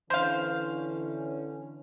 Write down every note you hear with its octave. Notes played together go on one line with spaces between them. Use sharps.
D3 E3 C#4 C5 F5